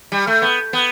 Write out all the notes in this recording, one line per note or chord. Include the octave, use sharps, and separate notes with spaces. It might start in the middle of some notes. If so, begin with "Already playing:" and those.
G3
A3
B3
B3